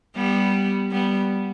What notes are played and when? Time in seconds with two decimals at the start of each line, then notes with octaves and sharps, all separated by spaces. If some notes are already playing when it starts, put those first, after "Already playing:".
0.16 G3 B3
0.91 G3 B3